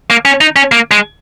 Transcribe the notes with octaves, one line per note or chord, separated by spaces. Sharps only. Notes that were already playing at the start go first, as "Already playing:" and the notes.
A#3
C#4
D#4
C#4
A#3
G#3